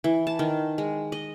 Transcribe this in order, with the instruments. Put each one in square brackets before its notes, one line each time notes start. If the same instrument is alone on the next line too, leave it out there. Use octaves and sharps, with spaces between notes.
[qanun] E3
A5
D#3
G#3
D#5